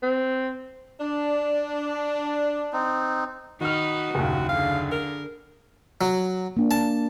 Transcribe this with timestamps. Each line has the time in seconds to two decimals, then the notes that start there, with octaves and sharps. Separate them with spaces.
0.03 C4
1.00 D4
2.73 C4 D#4
3.61 D#3 D#4 F#4 B4 D#5 F6
4.15 F#1 D#2 A#2 C#3
4.49 D3 G#4 B4 F5
4.92 A#4
6.01 F#3
6.57 A#3 D4
6.71 A5